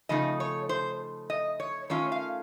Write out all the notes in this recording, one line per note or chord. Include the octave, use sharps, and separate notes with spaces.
C#3 F3 A3 D#4 D#5
C#5
C5
D#5
C#5
D#3 A3 C#4 F4 C#5
F5